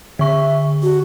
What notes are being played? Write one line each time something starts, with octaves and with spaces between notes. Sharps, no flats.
D3 E5 C#6
F#4